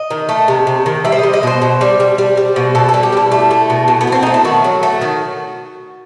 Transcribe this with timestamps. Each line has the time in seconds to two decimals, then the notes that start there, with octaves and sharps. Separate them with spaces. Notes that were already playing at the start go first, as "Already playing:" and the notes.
Already playing: D#5
0.11 D#3
0.29 A3
0.48 C3
0.67 C3
0.86 D#3
1.05 G3 E5
1.12 C5
1.19 G3 D#5
1.33 D#5
1.43 B2 C5
1.62 B2
1.81 G3
2.00 G3
2.18 G3
2.37 G3
2.56 B2
2.75 B2 A4
2.89 A4
2.94 G3
3.03 G4
3.13 G3 E4
3.32 A3
3.51 A3
3.70 B2
3.88 B2
4.01 B3
4.07 A3
4.12 C4
4.23 A3 D#4
4.34 E4
4.45 D#3 F#4
4.64 F#3
4.83 A3
5.02 D#3